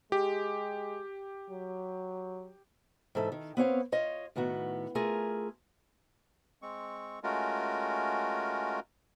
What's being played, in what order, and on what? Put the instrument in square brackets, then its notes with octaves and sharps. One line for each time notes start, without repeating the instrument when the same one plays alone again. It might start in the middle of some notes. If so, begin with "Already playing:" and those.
[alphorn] G#3 [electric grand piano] G4
[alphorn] F#3
[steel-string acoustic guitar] G#2 E3 A4 E5
D#3
B3 C4 C#5 F5
F4 C#5 D#5 F5
A2 D#3 B3 F#4
A3 F4 G#4 A#4
[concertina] G#3 C4 C#6
G#3 A3 C#4 F4 F#4 A#4